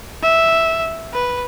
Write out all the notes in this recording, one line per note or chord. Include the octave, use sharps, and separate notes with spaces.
E5
B4